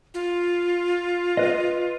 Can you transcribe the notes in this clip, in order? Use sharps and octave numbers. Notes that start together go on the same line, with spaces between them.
F4
B4 D#5